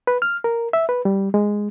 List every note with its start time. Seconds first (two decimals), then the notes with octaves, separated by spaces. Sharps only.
0.07 B4
0.22 F6
0.44 A#4
0.73 E5
0.89 B4
1.05 G3
1.34 G#3